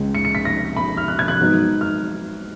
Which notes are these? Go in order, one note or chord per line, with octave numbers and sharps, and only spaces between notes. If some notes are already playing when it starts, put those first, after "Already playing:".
Already playing: C#2 C#3 G#3
C#7
C#7
B6
A#6
B5
F6
F#6
G#6
F#6
G#2 F#3 B3 D#4
F6